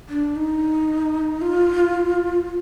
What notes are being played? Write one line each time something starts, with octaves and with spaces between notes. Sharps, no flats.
D4
D#4
F4